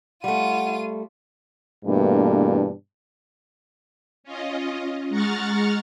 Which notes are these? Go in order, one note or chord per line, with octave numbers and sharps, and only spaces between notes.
G3 A3 F4 F#5 D#7
G2 B2 E3 A3 A#3 D4
C#4 F4 D#5
G#3 F#5 A#5 C#6 F6 A6